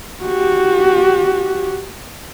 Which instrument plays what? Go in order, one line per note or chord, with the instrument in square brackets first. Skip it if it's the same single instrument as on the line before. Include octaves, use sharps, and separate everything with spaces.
[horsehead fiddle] F#4 G4